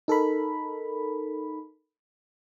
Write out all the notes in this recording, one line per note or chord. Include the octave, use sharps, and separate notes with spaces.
D#4 A4 A#4 B5